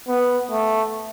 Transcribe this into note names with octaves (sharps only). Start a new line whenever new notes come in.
B3
A3